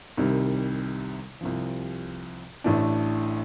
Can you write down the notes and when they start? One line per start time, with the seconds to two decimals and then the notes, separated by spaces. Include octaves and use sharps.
0.17 C2 C3 D#3 G3
1.41 C2 C3 F3
2.64 A1 A2 A3 D4